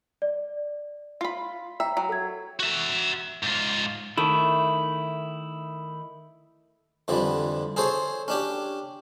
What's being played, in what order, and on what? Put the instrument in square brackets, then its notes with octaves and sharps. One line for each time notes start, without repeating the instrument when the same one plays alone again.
[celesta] D5
[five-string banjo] F4 B5
[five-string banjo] E5 [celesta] G5 A#5
[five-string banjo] F#3
[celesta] A4 G#6
[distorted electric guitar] F#4 E5
G#2 F4
[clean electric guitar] D#3 E4 [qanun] A3
[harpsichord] F2 D3 E3 G3
G#4 A4 C5 C#5
C#4 D4 G4